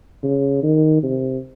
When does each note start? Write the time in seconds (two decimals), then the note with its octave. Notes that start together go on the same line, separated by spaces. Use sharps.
0.23 C#3
0.63 D#3
1.03 C3